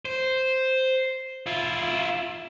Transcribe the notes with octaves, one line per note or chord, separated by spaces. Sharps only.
C5
E4 F4